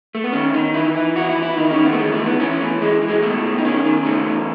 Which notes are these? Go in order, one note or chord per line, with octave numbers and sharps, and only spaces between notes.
A3
B3
D#3 C#4
D#3 D#4
E3 E4
E3
E3 F#4
E4
E3
E4
D#3 D#4
C#4
D#3
B3
A3
E3 G#3
A3
E3
B3
E3 C#4
E3 A3
E3 G#3
E3
G#3
B2 A3
B2
D#4
D#3 C#4
D#3
C#3 A3
E2